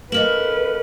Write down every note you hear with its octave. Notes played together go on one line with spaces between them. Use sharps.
A#3 C#4 A4 B4 D#5 F6 F#7